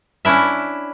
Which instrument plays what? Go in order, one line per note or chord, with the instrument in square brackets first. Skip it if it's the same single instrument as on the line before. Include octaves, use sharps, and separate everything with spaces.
[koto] C#4 D4 E4 E5